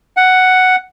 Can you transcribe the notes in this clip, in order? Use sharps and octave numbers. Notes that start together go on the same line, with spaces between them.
F#5